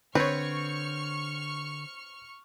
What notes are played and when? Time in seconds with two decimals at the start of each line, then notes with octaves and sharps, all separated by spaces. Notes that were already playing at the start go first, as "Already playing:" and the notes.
0.15 D3 C4 B4 C#5 C#6 F6 C#7